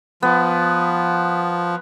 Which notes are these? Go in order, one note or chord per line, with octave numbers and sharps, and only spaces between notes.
F3 B3